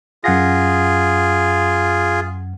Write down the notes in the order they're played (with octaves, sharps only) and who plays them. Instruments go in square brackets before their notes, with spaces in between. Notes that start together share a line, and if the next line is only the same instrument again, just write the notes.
[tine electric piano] F#2 F#5 A#6 [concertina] F4 G#4